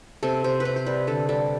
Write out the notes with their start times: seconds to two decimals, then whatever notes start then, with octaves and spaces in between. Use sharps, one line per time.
0.23 C3 A4
0.44 C3 C5
0.60 B4
0.65 C3 C5
0.76 C5
0.86 G3 B4
1.07 D3 A4
1.29 G3 A4